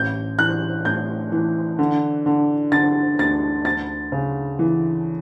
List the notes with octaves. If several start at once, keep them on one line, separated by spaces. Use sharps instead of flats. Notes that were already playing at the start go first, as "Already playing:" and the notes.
Already playing: A1 G6
E3 F#6
A2 G6
E3
D3
D3
D3 A6
D2 A6
D2 A6
C#3
E3